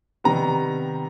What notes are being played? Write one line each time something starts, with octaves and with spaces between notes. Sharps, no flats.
C3 D#3 G3 B3 A#5